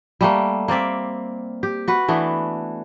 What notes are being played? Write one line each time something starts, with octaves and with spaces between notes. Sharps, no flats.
G3 A3 A#3
A#3 C4 D5 E5
G4
F#4 B4
E3 A3 B3 D4